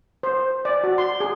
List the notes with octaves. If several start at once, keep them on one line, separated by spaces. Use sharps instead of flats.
C5
D5
F#4
C6
G#4